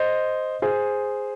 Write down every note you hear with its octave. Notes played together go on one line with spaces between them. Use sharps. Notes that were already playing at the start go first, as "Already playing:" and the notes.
Already playing: C5 D#5
G#4 C5